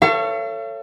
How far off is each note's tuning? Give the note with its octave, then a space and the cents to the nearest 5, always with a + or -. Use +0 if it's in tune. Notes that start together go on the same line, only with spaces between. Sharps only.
A4 +20 C#5 +0 F5 -45